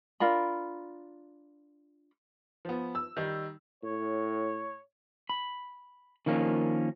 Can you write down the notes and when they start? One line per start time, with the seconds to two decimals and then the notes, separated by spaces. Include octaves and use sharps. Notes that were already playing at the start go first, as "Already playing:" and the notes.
0.20 D4 F4 A#4 B5
2.65 F3 B3
2.95 E6
3.17 D#3 G3 D#4
3.83 A2 C#5
5.29 B5
6.26 D#3 F3 A#3 C#4